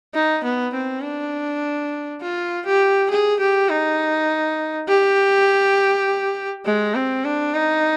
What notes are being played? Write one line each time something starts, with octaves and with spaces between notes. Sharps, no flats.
D#4
B3
C4
D4
F4
G4
G#4
G4
D#4
G4
G#3
C4
D4
D#4